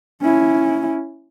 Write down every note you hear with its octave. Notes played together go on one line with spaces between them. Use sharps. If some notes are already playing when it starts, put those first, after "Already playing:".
C#4 E4